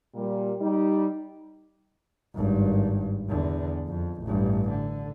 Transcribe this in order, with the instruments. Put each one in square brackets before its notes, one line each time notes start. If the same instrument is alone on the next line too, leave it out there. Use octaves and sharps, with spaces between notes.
[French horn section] A#2 G3
G3 D#4
[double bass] G#1 G2
E2 D3
F2
A1 G2
D3